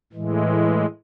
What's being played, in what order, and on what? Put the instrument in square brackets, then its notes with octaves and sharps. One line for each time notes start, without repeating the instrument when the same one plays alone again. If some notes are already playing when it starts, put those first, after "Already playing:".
[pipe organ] A2 E3 G#3